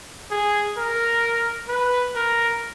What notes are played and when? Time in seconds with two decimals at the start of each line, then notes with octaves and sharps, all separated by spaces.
0.31 G#4
0.78 A#4
1.68 B4
2.15 A#4